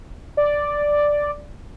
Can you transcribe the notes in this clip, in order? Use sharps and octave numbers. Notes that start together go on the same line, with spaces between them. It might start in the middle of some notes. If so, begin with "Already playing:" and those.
D5